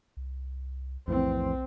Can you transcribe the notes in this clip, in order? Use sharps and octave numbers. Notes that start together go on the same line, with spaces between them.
C2
B1 F2 A2 E3 C4